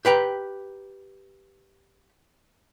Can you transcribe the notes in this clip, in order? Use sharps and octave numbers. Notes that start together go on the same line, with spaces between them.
G4 B4 G5 A#5